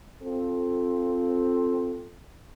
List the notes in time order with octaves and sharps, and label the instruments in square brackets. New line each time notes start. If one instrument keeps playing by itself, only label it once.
[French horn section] C4 F4 A4